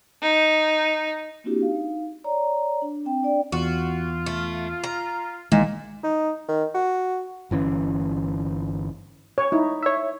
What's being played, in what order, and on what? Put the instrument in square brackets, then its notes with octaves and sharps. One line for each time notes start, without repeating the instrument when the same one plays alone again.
[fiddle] D#4
[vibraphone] A#3 C4 D4 E4 F#4 G4
D#4 F5
C#5 D5 A#5
D4
C4 G5
D4 D5 G5
[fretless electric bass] E2 [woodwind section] F4 [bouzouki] F#4
[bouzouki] A3
A#5
[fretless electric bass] A#1 D#3 E3 [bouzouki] A#2 [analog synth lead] G#3
[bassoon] D#4
D#3
F#4
[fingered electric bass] G1 E3 C4 C#4
[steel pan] C#5
D#4 E4
[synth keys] C#5 E5